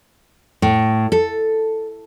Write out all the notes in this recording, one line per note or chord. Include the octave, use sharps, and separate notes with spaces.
A2
A4